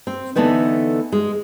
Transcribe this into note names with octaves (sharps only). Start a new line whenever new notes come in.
C4
D3 E3 A3 B3 D#4
G#3